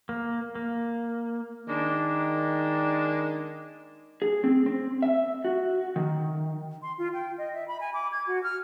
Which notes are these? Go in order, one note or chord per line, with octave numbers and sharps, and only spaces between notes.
A#3
A#3
D#3 G#3 A#3 D4
G#4
C4
C4
E5
F#4
D#3
C6
F4
G5
D#5
E5
B5
G#5
D6
G#6
F#4
F6